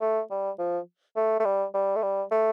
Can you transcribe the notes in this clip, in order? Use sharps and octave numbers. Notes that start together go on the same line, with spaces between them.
A3
G3
F3
A3
A3
G3
G3
A3
G3
A3